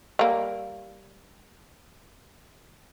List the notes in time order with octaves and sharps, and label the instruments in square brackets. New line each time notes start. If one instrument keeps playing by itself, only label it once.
[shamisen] G3 A#3